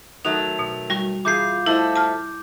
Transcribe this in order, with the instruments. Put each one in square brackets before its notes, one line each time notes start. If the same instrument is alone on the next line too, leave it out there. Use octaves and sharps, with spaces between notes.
[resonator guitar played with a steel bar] D#3 F#3 A3 [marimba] D#6 [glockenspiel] F7
[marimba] B2
G3 F#4 C#6
[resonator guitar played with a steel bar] E3 G#4 [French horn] F4 [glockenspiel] D6 G6 C7
[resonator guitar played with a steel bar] A3 C5 D#5 [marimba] E4
[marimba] A5 F6